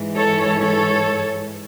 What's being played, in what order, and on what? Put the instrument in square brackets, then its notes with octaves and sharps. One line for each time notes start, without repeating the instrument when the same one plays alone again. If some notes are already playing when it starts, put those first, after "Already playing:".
Already playing: [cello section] G#2 E3
A4 C#5
A4 C#5